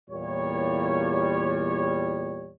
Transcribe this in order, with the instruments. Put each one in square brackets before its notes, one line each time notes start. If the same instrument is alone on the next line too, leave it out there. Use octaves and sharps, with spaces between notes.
[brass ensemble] E2 A#2 G3 C#5